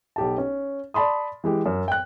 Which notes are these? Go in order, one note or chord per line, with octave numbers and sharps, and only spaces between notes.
B1 G4 A5
C#4
D5 A5 B5 C6 D#6
E3 G#3 G4
F#2
G5 F#6